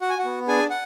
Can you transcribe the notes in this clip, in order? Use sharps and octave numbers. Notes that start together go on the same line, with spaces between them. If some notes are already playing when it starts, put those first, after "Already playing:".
F#4 F#5
G#5
F#4 F#5
B3
D4 G#4 G#5
F#5